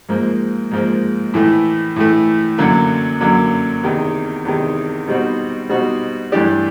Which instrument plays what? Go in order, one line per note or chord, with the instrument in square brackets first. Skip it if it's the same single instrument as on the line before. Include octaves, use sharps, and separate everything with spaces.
[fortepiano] G#2 F3 A#3
G#2 F3 A#3
A2 E3 A3
A2 E3 A3
F#2 D3 F#3 A#3
F#2 D3 F#3 A#3
E2 C3 D#3
E2 C3 D#3
B2 G3 C4 D#4 F#4
B2 G3 C4 D#4 F#4
G2 E3 A3 D4 G4